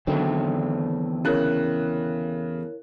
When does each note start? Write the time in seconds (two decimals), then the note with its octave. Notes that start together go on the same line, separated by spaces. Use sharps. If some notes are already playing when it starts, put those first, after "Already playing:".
0.07 E2 D3 D#3 F#3 A3 C4
1.25 C#3 E4 A#4 C#5 F#6